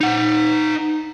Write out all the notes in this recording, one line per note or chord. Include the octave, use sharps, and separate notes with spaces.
D#4 F#5